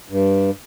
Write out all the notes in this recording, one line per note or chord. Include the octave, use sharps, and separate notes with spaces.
G2